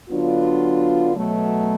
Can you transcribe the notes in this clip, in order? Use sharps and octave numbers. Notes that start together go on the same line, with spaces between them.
D3 F#3 B3 D4 F4
B2 F#3 A3